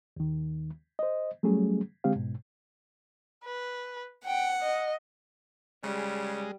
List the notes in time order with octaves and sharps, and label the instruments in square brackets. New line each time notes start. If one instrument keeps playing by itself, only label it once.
[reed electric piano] D#2 D#3
C5 D#5
F#3 G3 A3 C#4 G#4
D3 G#3 C4 G4 F5
G#2 B2
[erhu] B4
[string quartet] F#5 [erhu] G5
[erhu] D#5
[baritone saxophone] C#3 [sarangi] G3 [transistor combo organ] G#3